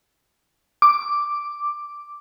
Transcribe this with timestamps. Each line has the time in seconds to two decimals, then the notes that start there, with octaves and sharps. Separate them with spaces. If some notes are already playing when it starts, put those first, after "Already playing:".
0.82 D6